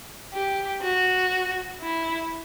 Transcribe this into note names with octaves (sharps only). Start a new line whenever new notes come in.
G4
F#4
E4